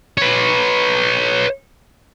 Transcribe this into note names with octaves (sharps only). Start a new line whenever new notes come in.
B4 C#5